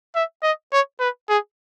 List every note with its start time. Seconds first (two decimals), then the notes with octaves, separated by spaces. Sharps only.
0.15 E5
0.43 D#5
0.72 C#5
1.00 B4
1.29 G#4